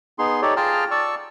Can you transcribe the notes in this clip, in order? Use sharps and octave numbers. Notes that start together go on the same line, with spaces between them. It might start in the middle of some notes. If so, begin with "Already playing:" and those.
B3 D#4 G#4 C6
D#4 G4 A4 C#5 D5
F4 G#4 G5 A5 A#5 F6
D5 A5 C#6 E6